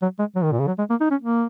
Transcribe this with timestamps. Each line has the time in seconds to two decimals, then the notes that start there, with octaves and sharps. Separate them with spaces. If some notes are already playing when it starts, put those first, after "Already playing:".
0.02 F#3
0.19 G#3
0.35 F#3
0.43 D#3
0.52 A#2
0.59 C#3
0.67 F#3
0.78 G#3
0.90 A#3
1.01 D#4
1.11 C#4
1.22 A#3